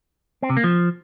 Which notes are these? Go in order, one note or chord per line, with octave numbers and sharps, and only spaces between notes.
C4
C3
A#3
F3